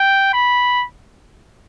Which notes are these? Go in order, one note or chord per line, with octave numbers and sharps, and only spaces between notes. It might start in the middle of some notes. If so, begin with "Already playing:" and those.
Already playing: G5
B5